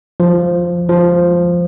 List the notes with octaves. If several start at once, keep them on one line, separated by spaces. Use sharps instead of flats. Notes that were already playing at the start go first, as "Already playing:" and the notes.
F3
F3